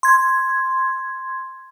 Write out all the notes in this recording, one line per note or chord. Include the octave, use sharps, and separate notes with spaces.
C6 G#6